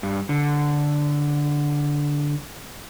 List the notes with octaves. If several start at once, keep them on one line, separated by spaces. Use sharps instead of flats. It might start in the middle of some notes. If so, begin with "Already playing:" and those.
G2
D3